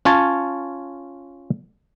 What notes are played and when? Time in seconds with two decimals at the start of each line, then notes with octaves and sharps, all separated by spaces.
0.05 C#4 F4 C#5 A5